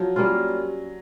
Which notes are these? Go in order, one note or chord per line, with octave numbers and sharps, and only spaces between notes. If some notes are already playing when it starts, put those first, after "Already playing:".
Already playing: F3 F#3
G3 A#3 C#4 F4